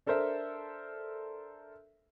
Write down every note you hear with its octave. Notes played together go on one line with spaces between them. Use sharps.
D4 A4 A#4 C5 E5